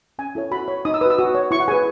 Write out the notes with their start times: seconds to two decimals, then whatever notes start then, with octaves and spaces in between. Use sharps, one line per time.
0.19 C#4 G#5
0.35 E4 A4 C#5
0.51 F#4 B5
0.68 C#5
0.85 D#4 D#6
0.94 E6
1.01 F#4 B4 D#6
1.10 E6
1.18 F#4 D#6
1.35 C#5
1.51 E4 C#6
1.60 F#5
1.68 G#4 B4 G#5